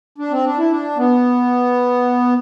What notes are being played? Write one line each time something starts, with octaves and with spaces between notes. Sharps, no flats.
D4
C4
D4
E4
D4
B3